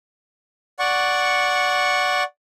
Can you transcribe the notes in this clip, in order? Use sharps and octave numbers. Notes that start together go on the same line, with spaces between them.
D5 F#5 C#6